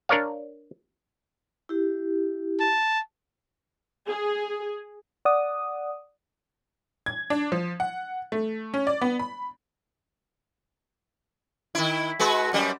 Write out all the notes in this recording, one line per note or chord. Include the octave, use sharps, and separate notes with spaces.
D4 A#4 C#5 D5 F5
E4 G4
A5
G#4
D5 F#5 D#6
G#6
D4
F3
F#5
A3
C#4
D5
B3
B5
D#3 E4
G#3 F#4 B4
F#2 G3